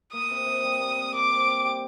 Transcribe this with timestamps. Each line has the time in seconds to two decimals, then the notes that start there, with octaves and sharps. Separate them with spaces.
0.13 A#3 D#6
0.30 C3
0.46 C3
0.63 G3
0.80 A#3
0.97 C3
1.14 A#4 D6
1.31 C4
1.47 C4
1.64 G4